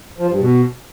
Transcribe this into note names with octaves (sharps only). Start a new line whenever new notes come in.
F3
G2
B2